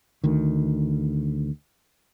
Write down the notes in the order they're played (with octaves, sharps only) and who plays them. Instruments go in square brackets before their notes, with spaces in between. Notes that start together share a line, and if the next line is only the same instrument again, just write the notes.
[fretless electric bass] D2 D#3